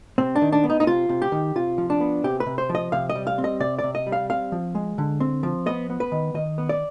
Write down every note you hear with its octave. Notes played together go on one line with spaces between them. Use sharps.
C3 C4
D4
D#3
D4
B3
D#4
D#4
C3 F4
C3
G4
D#3
C3 F4
F3
D4
B3
C3 G4
B4
C3
C5
F3
D#5
C3 F5
D#5
G3
F5
C4
D#5
C3 D5
D5
C3
D#5
G3
F5
C4 F5
F3
G#3
D3
C4
F3
B3 D#5
B3
B4
D#3
D#3 D#5
B3
D5